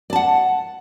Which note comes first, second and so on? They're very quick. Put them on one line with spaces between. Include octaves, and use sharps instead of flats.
D5 A5 F#5